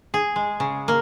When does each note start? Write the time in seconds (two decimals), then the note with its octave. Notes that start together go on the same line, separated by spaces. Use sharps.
0.14 G#4
0.36 G#3
0.60 C#3
0.88 A#3